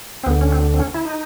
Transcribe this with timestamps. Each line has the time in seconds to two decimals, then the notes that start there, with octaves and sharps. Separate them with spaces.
0.23 C4
0.26 D2 B3
0.30 D3
0.41 C#4
0.53 C4
0.74 C4
0.80 C#4
0.94 E4
1.05 D#4